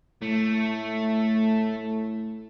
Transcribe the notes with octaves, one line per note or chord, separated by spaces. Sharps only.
A2 A3